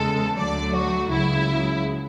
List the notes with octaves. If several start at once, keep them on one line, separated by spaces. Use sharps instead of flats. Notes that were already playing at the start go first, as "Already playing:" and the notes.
Already playing: E2 C#3 G#3 A4
D2 D3 F#3 A3 D5
F#4
C#2 C#3 F#3 E4